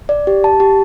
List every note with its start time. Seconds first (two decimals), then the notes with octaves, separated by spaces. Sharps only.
0.09 D5
0.27 G4
0.44 A5
0.60 G4